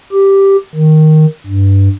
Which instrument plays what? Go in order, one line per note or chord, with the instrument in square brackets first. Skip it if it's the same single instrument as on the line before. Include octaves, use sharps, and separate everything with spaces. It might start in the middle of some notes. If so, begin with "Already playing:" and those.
[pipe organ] G4
D#3
G2